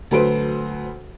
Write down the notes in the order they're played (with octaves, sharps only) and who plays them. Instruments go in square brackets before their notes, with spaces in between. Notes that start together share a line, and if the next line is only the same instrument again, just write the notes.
[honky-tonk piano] D2 F#3 A4 B4 C5 D7